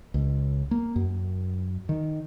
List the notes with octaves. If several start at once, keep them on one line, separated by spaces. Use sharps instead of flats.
C#2
A#3
F#2
D#3